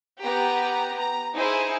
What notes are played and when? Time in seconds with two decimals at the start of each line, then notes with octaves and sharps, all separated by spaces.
0.23 B3 G4 A#5
0.98 A#5
1.36 D#4 E4 G#4 C5